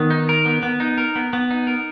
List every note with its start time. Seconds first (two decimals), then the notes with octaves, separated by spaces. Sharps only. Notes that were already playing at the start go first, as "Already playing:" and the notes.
Already playing: D#3 B3
0.10 D#4
0.29 A#4
0.45 B3
0.63 B3
0.80 D#4
0.98 A#4
1.16 B3
1.33 B3
1.50 D#4
1.67 A#4